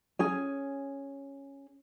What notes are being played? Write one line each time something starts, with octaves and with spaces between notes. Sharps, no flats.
C#4 G#4 G#5